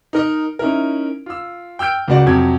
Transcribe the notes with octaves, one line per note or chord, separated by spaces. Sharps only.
D#4 A#4 D#5
C#4 D#4 E4 A#4
F4 E6
G5 E6 F6 G6 D7
C#2 A#3 F#4 D5 D6
F2 C3 F#3 G#6